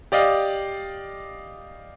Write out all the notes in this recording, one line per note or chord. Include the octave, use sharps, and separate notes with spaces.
G4 D5 D#5 F5